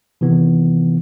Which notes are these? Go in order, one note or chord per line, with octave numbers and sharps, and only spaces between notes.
C3 D#3 E3 B3